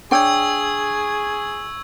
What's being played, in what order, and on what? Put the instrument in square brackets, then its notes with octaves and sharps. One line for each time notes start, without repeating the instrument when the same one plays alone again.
[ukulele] D4 C#5 G5 [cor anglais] G#4 [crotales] C#6 E6 G#6